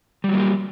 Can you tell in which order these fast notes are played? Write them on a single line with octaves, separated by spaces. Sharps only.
G3 F#3 A#3 G4